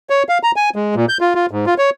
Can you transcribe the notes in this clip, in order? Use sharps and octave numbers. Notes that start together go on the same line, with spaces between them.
C#5
F5
A#5
G#5
G#3
A#2
G6
F4
F4
G#2
F4
C#5